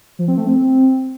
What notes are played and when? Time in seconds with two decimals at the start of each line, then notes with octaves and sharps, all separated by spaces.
0.19 F3
0.28 C4
0.37 A3
0.47 C4